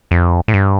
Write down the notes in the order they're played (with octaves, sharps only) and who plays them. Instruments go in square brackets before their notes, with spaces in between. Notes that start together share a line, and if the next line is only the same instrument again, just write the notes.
[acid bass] F2
A2
G2